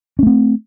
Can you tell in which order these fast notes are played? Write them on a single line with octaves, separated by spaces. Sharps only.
C#4 A3 C4